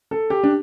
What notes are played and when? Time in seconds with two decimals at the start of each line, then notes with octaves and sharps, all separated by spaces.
0.11 A4
0.30 G4
0.44 D4